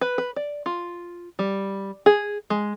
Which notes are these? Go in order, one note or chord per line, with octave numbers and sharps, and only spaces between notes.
B4
B4
D5
F4
G3
G#4
G#3